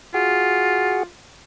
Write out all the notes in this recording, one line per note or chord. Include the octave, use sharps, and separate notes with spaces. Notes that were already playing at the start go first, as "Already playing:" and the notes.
F4 F#4 G#4 F#5